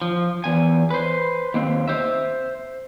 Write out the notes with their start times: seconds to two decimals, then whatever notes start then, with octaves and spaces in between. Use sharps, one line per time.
0.02 F3
0.44 E2 G#5
0.91 B4 C5
1.54 D#2 C4
1.88 C5 E5